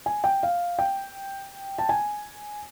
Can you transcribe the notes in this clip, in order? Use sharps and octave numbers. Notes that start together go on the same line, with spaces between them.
G#5
G5
F5
G5
A5
G#5